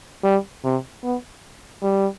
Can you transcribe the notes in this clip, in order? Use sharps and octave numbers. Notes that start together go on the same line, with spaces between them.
G3
C3
B3
G3